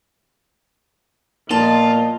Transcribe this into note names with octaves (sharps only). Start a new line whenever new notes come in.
A#2 F3 B3 F4 D#5 A5